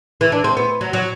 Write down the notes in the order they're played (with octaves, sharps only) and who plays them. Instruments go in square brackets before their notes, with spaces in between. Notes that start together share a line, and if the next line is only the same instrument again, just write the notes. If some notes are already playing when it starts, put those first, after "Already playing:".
[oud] E3
D4
C4
B3
F#3
F#3